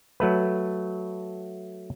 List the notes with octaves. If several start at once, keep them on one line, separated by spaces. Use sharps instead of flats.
F#3 A3 B4